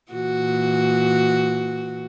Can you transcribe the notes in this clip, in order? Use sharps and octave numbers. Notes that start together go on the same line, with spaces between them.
A#2 E3 F#4